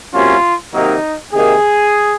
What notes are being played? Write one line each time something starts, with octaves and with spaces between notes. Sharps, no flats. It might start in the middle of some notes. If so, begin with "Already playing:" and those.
C3 F#3 A#3 C#4 F4
C3 D#3 F#3 A#3 D#4
C3 D#3 A#3 G#4